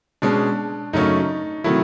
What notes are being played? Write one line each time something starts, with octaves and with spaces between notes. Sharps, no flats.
B2 G#3 C#4 D4
F#2 C#3 F#3 A3 C#4 D#4
C3 D#3 F#3 A3 E4